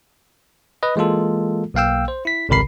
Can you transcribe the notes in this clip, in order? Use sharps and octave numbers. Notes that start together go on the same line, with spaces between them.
B4 D#5
E3 G#3 A#3 F4 A4
B1 A#3 F5 G5 E6
C5
E4 B6
G#1 C#2 C3 A#4 B5 C7